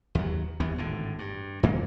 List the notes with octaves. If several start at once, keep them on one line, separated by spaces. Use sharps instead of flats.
D#2 F#3
D#2 E3 B3
G#1 A2 D3
G2
G2 D#3 A#3 C#4